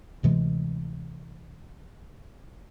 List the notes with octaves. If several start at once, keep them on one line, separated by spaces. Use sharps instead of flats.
D2 C3 E3 G#3